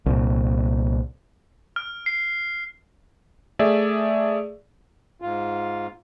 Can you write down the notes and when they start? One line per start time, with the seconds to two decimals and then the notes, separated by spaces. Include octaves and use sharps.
0.06 C2 A#2
1.76 F6
2.06 C7
3.59 A3 G#4 D5 E5
5.22 G#2 F4